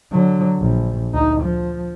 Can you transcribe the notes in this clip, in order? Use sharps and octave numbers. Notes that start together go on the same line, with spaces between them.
D3 F#3
A#1
D2 D#4
F3